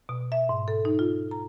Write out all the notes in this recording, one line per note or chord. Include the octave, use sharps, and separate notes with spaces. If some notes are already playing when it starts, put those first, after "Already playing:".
B2
E5
G#2
A4
D#4
F4
A#5